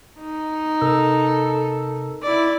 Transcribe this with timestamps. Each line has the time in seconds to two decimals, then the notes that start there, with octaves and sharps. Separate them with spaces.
0.19 D#4
0.81 C3 A4 A#4 E6
2.22 E4 D5